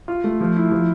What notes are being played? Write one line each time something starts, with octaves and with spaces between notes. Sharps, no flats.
F4
A3
F3
E4
F3